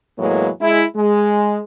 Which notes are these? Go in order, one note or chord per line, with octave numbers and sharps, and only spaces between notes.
E2 A2 E3 F#3 G#3 A#3
G#3 E4
G#3